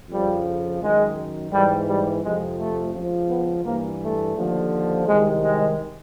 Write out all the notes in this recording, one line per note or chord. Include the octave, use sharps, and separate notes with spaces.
F2 C#3 F3 G3
F#2 D#3 G#3
G#2 E3 G3
G3
F2 C3 F3 G#3
A3
C#2 C#3 F3
B3
G2 E3 A#3
A3
D#2 D3 F3
C2 C3 D#3 G#3
G#3